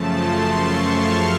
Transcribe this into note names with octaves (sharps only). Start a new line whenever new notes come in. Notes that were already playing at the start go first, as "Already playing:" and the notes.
Already playing: F#2 C#3 F3 A3 A5
C6
C#6
F6